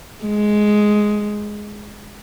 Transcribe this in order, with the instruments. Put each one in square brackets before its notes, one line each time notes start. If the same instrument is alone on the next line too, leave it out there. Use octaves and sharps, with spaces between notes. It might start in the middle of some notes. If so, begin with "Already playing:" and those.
[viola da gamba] G#3